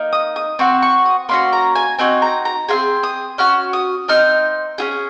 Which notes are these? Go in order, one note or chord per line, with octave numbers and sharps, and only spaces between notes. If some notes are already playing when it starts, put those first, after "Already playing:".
Already playing: A#3 D#4
D#6
D#6
C4 F#4 C#6
C#6
D#6
A#3 C#4 F#4 C6
A#5
G#5
C4 D#4 F#4 G#5
A#5
A#5
C4 F4 G#4 C6
D#6
C#4 F#4 F6
D#6
C4 D#4 F6
C#4 F4 G#4